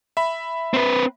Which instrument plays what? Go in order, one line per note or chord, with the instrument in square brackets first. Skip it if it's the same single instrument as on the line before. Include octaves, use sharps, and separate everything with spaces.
[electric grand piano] E5 B5
[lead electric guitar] C4 B4